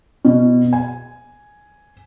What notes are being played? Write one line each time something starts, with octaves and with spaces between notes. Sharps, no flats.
B2
G#5